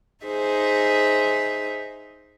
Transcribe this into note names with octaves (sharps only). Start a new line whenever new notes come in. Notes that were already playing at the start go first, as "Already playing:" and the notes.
D#4 G#4 C5 E5